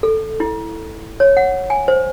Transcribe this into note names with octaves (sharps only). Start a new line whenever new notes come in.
A4
E4
C#5
F#5
G#5
C5